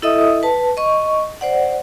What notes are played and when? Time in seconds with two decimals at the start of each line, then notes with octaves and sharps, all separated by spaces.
0.02 E4 A4 D#5 E5 D#6
0.43 B4 A5
0.77 D#5 C#6
1.41 C5 D5 F#5